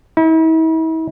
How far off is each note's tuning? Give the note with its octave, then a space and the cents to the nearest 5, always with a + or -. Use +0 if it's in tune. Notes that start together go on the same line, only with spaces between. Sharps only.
E4 -45